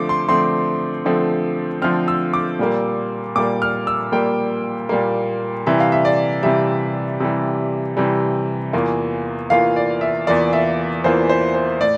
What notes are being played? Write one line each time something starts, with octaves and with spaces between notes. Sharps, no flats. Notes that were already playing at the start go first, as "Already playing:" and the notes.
Already playing: D3 F3 A3 C4 D6
C6
D3 F3 A3 C4 C6
D3 F3 A3 C4
D3 F3 A3 C4 F6
E6
D6
A#2 G3 A#3
A#2 G3 A#3 D6
F6
E6
A#2 G3 A#3 G5
A#2 G3 A#3
C3 E3 G3 E5
F5
E5
D5
C3 E3 G3 E5
C3 E3 G3
C3 E3 G3
E2 E3 A#3 F4
E2 E3 A#3 F4 F5
D5
E5
E2 E3 A#3 F4 D5
E5
E2 E3 A#3 F4 C5
C5
C5
A2 D5